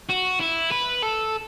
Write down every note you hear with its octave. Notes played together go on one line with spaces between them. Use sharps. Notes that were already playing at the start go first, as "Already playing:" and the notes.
F#4
E4
B4
A4